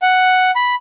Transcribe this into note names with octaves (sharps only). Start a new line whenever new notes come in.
F#5
B5